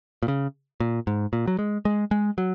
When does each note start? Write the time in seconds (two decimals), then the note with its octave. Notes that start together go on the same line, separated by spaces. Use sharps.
0.23 A#2
0.28 C#3
0.80 A#2
1.07 G#2
1.33 A#2
1.47 F#3
1.59 G#3
1.85 G#3
2.11 G#3
2.38 F#3